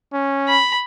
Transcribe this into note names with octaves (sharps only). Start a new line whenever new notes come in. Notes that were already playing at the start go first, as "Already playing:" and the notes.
C#4
B5